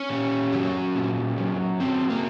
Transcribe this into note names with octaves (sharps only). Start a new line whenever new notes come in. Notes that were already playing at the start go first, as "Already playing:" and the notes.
Already playing: C#4
A#2
F#3
A#2
F#3
F#3 C4
A#3